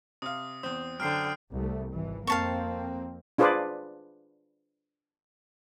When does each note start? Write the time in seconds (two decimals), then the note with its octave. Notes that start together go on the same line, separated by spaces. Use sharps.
0.22 C3 F5 D#6
0.63 E2 C4 D#6
1.00 F#2 D3 C5 G5 F6 C7
1.53 C2 A3
1.93 G#1 E3
2.27 F2 A#3 C4 F5 A5 C#6
3.38 D4 F4 G#4 B4 C5 D5